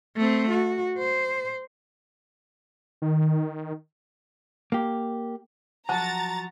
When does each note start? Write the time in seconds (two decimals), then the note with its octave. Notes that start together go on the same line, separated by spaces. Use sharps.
0.17 A3 C4
0.50 F#4
0.98 C5
3.02 D#3
4.72 A#3 G4
5.89 F3 F#3 F#4 F#5 A5 A#5 A6